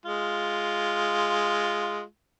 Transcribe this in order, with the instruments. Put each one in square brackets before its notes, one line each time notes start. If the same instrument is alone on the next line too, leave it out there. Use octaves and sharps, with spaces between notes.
[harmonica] G#3 F4